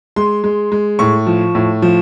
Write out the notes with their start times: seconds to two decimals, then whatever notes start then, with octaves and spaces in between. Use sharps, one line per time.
0.16 G#3 C6
0.44 G#3
0.72 G#3
0.99 A2 C#6
1.27 F3
1.55 A2
1.82 F3